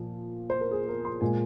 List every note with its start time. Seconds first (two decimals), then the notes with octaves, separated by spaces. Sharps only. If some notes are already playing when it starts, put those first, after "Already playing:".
Already playing: A#2 F3 A#3 F4
0.50 C5
0.61 A#4
0.71 G#4
0.88 A#4
1.05 C6
1.21 A#2 G#3 G#5